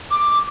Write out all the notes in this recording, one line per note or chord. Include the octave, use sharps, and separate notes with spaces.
D6